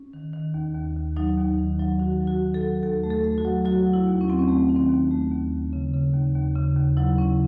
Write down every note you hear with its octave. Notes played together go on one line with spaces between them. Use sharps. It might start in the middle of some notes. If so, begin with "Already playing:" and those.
Already playing: C#4
D#3
D#3
D#2
D#2
D#2
F#3 D#4
D#2
D#3
F#3
D#3 F#4
F#3
F#4
D#3
A4
F#3
D#2 A4
A3
A4
A3
F#4
F#3
F#3 F#4
F#3
E4
D#2
C#4
F#3 C4
C#4
A3 C4
D#3
C4
D#2
A3
D#2
D#2
C#3
C#3
D#2
D#2
C#3
D#2
F#3 E4
C#3 C#4